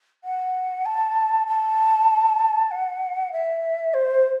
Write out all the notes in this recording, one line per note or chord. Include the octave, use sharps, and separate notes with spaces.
F#5
A5
A5
F#5
E5
C5